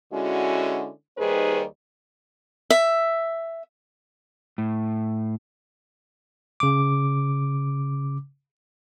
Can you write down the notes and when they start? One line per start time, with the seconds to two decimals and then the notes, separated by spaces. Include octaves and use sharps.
0.12 D3 G#3 C#4 E4 F#4
1.18 D#2 D#3 G3 G#4 B4 C5
2.70 E5
4.58 A2
6.60 C#3 D6